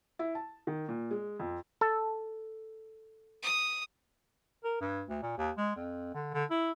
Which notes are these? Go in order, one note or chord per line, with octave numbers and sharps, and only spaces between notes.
E4
A5
D#3
A#2
G#3
F2
A4
D#6
A#4
G2
D2
A#2
D#2
G#3
F2
D3
D3
E4